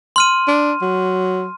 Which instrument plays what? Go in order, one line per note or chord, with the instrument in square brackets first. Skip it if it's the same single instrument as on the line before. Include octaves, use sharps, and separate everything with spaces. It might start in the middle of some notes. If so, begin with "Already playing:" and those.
[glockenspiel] C6 F6 D#7
[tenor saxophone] D4
F#3